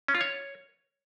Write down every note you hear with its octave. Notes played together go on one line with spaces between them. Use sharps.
C#4
F4
C#5